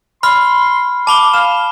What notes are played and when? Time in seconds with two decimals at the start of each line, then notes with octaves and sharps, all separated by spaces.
0.23 B5 C6 F6
1.07 A5 B5 D6 G7
1.34 F5 E7